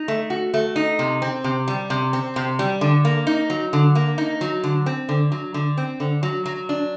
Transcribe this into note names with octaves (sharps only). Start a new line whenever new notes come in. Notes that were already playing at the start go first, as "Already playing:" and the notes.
Already playing: D#4
A3
F#4
A3
D#4
C3
C4
C3
G3
C3
C4
C3
G3
D3
A#3
D#4
F#3
D3
A#3
D#4
F#3
D3
C4
D3
F#3
D3
C4
D3
F#3
F#3
D4